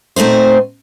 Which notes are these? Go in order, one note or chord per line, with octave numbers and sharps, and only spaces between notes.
A#2 A3 C4 D#4 C5